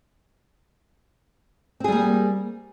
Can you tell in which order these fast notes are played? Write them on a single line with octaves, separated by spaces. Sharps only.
C4 G#4 G3 A#3